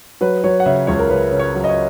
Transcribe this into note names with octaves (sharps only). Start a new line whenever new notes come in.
F#3 B4
F#3 C#5
F#5
C#3 E5
C#2 C#5
A#4
C#3 B4
C#3
C#5
F#3
D#5
C#5